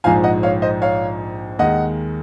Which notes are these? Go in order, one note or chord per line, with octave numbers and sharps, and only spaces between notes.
A#1 G#2 F3 F5 G#5
D#5 F#5
C#5 F5
C5 D#5
C#5 F5
D#2 D#3 G#3 D#5 F#5